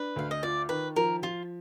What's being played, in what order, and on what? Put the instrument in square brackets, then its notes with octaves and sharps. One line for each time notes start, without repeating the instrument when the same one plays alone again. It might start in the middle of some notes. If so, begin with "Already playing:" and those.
Already playing: [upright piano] D4 [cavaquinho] B4
[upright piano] D2 [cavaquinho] F5
[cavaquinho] D#5
[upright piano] F4 [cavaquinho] D5
[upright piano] D#3 [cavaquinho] B4
[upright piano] F3 [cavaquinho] A#4
[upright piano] F3 [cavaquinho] F4